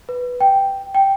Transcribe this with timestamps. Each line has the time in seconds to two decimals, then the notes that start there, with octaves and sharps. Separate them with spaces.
0.09 B4
0.41 G5
0.95 G5